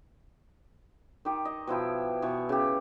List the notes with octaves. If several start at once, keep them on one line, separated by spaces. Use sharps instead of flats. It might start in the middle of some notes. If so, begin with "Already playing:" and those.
D#3 G4
D#5
B2 F3 E4 G5
B2 E3 C#6
C#3 G4